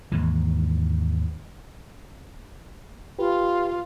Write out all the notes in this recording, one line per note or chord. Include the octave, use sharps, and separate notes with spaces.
D#2 G#2 E3
F4 G4 B4